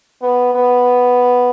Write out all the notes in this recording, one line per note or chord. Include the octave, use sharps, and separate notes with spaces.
B3
B3